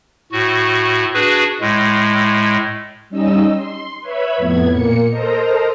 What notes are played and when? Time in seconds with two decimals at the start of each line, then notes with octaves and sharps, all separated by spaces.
0.32 A2 F#4
1.14 D4 F#4 G#4 B4
1.61 A2 G#3
3.10 G3 C#4 D#4 D#5 E6
3.55 C6
4.01 B4 C#5 E5 B5
4.37 F2 A2 B3 G#6
4.71 A#2 A#3 C#7
5.09 A4 A#4 C5 D#5 A#5